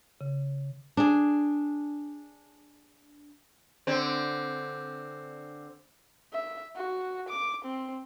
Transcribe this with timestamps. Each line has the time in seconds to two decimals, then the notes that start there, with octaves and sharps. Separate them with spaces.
0.21 C#3
0.97 D4 G#4
3.87 D3 C4
6.33 E5
6.76 F#4
7.29 D6
7.65 C4